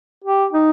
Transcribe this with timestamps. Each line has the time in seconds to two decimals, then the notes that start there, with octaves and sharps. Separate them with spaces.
0.24 G4
0.53 D#4